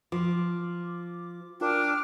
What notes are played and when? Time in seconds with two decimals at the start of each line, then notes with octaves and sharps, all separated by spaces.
0.12 F3 D6
1.61 D4 F4 A#4 G5 D6 F6